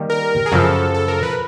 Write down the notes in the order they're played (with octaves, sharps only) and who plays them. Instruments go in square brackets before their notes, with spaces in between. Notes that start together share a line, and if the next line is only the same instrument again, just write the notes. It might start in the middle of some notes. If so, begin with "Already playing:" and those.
Already playing: [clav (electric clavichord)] D#3 G3 A#3 D#4 G4
[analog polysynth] A#4
G#4
[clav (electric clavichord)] F#2 C#3 F3 [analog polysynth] A4
[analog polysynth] A4
A#4
B4